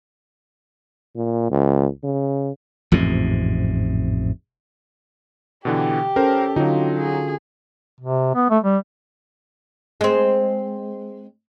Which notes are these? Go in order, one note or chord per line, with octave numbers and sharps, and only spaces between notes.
A#2
C#2
C#3
A1 F2 G#2 C3
B2 D3 E3 G4
C#4 A4 A#4 C5
D3 F#3 D#4 F4 F#4
G#4
C3
B3
A3
G3
G#3 C4